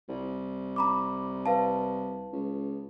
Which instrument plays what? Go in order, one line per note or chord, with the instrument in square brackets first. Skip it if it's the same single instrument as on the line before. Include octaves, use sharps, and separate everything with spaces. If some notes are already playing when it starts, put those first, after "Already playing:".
[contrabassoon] C2
[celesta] A#5 B5 D6
B4 F5 A5
[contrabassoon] C#2